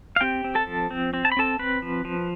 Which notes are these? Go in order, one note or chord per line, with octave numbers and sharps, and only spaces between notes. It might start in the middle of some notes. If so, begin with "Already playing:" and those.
F5
C4 G4 G5
C4
A4 A5
F3
C4
C4
A5
B5
C4 A4 A5
C4 B4 B5
F3
F3